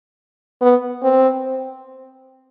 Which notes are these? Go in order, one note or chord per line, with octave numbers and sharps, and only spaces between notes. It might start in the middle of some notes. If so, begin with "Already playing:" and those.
B3
C4